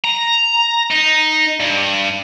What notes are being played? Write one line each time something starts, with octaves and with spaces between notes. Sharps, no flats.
A#5
D#4
G2